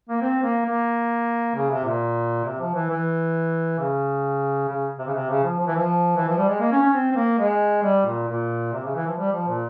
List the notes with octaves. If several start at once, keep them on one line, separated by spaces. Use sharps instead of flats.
A#3
C4
A#3
A#3
C#3
C3
A#2
C3
F3
E3
E3
C#3
C#3
C3
C#3
C3
C#3
F3
F3
E3
F3
E3
F3
G3
G#3
A#3
C#4
C#4
C4
C4
A#3
G#3
G3
A#2
A#2
C3
C#3
E3
F3
G3
F3
A#2